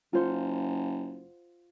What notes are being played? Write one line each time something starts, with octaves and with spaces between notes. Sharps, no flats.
F#1 F4 C5 F#5